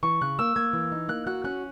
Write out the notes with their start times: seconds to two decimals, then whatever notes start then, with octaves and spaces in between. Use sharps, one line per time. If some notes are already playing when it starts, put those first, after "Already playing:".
0.03 E3 C#6
0.21 C#3 F#6
0.39 A#3 E6
0.56 A#3 G#6
0.73 E3
0.92 D#4
1.08 A#3 F#6
1.27 F#4 F#6
1.44 C#4 F#6